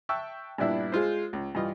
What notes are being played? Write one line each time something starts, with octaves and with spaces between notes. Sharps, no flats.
E5 G5 A5 C#6 E6 F#6
G2 A#2 B3 D4 E4 E5
G#3 F4 C5
C#2
G2 E3 F4 D#5